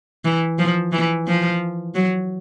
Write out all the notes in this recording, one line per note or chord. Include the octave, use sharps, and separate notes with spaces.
E3
F3
E3
F3
F#3